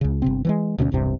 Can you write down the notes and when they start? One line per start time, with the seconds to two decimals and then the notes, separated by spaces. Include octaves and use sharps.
0.01 C#2 C#3
0.22 G1 C3 C4
0.45 E3 F#3 G#3
0.78 D2 B2 B3 C#4
0.92 E1 C2 G2 C3